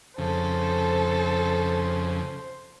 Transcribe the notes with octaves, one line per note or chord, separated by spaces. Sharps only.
F2 C#3 A4 C5